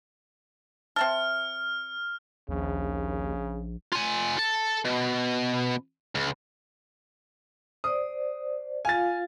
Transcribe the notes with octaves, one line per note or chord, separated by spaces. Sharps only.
C4 E5 A5 F6
A#1 D#2 C#3
F4 G#5
A4
B2
C#2
C5 D5 D#6
F4 F5 G#5 A6